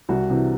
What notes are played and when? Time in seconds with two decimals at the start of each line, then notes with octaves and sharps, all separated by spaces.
0.09 C2 F#4
0.30 C3 E3